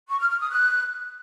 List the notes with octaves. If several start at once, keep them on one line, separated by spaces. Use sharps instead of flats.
C#6
F6
F6
D#6
F#6